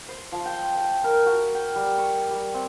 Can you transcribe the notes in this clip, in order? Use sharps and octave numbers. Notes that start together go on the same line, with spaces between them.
C5
F3
G5
G5
A#4
F#4
G5
G3
C#6
G3
C4